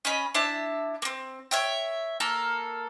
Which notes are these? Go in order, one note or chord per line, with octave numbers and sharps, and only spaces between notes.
C#4 D#5 B5
D4 E4 E5 A5
A#3 C4
C#5 E5 G5
A#3 A4 A#4